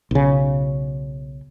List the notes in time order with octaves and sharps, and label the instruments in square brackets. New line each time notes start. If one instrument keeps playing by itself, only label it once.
[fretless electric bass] B1 C#3